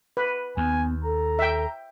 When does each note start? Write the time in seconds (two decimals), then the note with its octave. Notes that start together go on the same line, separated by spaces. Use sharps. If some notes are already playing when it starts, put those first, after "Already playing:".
0.17 B4
0.57 D#2 B3 G#5
1.04 A4 A#5
1.39 E5 G5